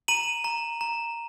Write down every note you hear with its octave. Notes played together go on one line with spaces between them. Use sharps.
A#5 D#7 F#7
A#5
A#5